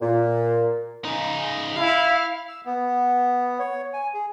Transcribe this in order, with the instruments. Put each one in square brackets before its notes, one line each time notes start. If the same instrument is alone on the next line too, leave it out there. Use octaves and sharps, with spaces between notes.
[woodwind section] A#2
[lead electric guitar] C#3 D#4
[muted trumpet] E4 [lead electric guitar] F5
[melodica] E6
B3
C#5
G#5
G#4